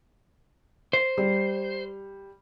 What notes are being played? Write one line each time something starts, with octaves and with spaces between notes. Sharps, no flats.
C5
G3